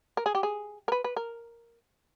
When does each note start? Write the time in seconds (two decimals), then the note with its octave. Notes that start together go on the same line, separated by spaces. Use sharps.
0.17 A#4
0.26 G#4
0.35 G4
0.43 G#4
0.88 A#4
0.92 B4
1.04 B4
1.16 A#4